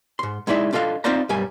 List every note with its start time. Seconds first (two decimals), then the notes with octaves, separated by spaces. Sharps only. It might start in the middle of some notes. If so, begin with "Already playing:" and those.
0.19 G#2 C6
0.47 G#3 D#4 E4 D5 E5
0.72 D4 F4 A4 D#5 F5
1.04 C4 D#4 F4 C5 D5 A#5
1.29 B1 G2 G3 A#4 G#5